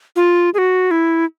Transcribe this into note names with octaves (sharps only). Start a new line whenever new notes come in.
F4
G#4
F#4
E4